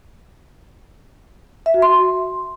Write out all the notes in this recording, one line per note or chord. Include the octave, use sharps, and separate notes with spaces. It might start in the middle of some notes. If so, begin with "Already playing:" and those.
E5
F#4
C6